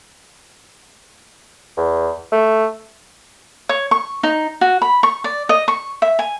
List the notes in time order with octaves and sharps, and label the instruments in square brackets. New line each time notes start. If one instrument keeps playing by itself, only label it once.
[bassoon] E2
A3
[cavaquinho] C#5
C#6
D#4
F#4
B5
C#6
D5
D#5
C#6
E5
G#5